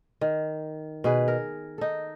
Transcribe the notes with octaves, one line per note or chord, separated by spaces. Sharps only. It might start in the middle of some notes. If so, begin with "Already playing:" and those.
D#3
B2 G#4 B4
A#4
D#4 A4